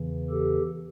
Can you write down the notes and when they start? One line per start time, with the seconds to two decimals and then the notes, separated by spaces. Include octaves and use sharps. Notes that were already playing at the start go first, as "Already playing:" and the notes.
Already playing: E2 C#3 E3
0.30 G4 A4